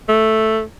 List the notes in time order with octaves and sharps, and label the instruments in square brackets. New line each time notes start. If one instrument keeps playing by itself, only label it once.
[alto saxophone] A3